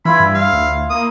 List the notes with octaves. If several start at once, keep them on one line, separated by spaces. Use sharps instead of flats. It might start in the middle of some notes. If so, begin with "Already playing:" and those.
E3 E4 F4 E5 B5
G2
F5
D2
A#3 D#6